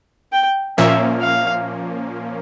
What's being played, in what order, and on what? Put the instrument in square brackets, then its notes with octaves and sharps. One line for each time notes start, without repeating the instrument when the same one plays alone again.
[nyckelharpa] G5
[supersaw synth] A#2 F3 A#3 C#4 [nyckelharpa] E5
[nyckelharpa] F5